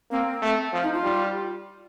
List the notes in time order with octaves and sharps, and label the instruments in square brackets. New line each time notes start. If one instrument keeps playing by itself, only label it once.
[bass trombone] A#3 [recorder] C4
[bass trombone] A3
F3
[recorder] D#4
F4
[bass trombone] G3